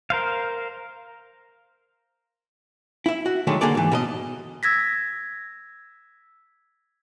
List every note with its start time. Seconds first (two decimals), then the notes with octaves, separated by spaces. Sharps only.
0.10 A#4 C5 F5
3.06 E4 E5
3.26 F#4
3.47 D3 D#3 F#3 G#3 A3
3.61 D3 A#3 G#4 A4 D5
3.75 G#2 E3
3.91 B2 A#4 D#5
4.63 E6 G#6 A#6 B6